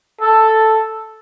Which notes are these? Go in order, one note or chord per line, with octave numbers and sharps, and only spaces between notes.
A4